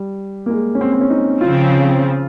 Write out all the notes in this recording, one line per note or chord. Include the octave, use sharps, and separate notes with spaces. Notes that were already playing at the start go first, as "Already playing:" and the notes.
Already playing: G3
A#3
G#3
C#4
C4
C4
C#4
D#4
C#3 F3 C4 F4